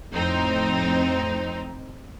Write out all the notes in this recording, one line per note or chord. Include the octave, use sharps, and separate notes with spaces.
F2 A2 C4 D#4